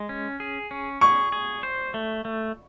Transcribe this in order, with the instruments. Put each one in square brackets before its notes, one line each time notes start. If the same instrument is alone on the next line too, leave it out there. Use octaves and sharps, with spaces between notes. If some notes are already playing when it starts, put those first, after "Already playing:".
Already playing: [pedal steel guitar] G#3
C#4
G#4
C#4
[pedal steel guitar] G#4 [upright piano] C#6
[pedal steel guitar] G#4
C5
A3
A3